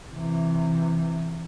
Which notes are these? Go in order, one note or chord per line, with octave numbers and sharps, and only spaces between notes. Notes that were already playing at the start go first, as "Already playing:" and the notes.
C3 E3